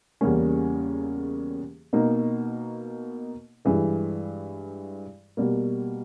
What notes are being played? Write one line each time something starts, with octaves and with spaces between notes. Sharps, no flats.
E2 C#3 G3 A#3 C#4
B2 A#3 D#4
G2 E3 G#3
B2 G3 A#3